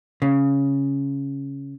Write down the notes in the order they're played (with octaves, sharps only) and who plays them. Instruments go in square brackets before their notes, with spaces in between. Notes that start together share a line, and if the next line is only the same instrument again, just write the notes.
[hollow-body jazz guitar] C#3